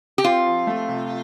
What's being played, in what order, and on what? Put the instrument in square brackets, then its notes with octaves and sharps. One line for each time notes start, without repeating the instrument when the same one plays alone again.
[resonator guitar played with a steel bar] G4
[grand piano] C4 [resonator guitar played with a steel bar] F4
[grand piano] F3
A3
C3